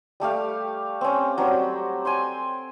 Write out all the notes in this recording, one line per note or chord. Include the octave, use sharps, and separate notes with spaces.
G3 A3 G4 F5
C4 C#4
F#3 G3 C4 G4
C5 G5 G#5